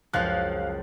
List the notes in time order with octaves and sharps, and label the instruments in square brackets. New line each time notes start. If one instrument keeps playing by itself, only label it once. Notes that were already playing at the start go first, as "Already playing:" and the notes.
[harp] F#1 C#2 G6 [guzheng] F3 [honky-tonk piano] F5 F#6